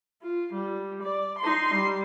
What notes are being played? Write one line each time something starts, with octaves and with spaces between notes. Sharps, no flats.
F4
G3
D5
D#4 C6
G3